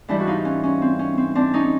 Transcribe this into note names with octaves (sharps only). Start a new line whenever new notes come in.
G#2 E3 G3 D4 E4
F#4
D#4 F4
C#4
C#4
C4
C#4
C4
C4 D4
C#4 D#4